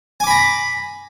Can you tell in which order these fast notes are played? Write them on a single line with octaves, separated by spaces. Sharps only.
G#5 D6 B5 A#5